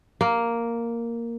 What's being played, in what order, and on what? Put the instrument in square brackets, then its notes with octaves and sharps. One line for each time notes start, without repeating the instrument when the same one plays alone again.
[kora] A#3